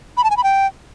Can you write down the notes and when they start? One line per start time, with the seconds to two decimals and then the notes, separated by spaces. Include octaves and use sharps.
0.17 B5
0.24 A5
0.31 G#5
0.37 B5
0.44 G5